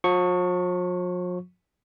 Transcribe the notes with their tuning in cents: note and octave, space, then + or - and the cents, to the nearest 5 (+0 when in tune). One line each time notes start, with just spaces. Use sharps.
F3 +45 C#6 +0